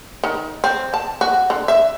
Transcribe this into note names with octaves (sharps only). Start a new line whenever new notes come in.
D#3
C4
A5
F#4
D3
E5